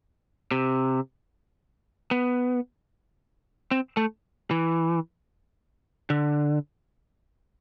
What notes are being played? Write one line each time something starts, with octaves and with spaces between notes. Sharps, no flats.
C3
B3
C4
A3
E3
D3